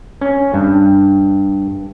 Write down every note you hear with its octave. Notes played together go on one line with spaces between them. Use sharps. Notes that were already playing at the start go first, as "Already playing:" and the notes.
C#4
G2